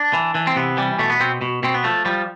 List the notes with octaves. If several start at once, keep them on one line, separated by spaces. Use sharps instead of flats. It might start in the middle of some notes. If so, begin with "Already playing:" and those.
Already playing: D4
E3
E3
C4
C3 B3
E3 G3
B2 A3
B3
B2 C4
B2
B2 C4
B3
F3 A3
F3 G3